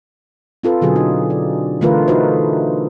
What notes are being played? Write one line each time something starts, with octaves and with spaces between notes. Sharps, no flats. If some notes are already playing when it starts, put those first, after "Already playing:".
C4 F4 A4 B4
B2 D3 F#3 G#4
D#4
D5
D3 E3 A3 F4 A#4 B4
D#4 F#4 A4 B4 C5